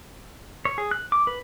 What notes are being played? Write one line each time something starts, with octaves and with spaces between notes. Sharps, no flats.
C#5
G#4
F#6
D6
B4